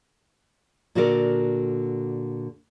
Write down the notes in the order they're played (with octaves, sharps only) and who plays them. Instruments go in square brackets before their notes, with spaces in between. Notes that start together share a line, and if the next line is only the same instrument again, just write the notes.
[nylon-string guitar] A#2 D3 F#4 A4 A#4 D5